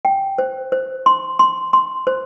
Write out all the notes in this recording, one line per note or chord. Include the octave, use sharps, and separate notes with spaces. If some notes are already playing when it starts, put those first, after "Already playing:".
G5
C5
C5
C6
C6
C6
C5